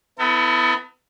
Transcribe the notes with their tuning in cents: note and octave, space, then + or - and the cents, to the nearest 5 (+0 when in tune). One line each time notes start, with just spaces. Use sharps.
B3 +35 E4 +0 A4 +45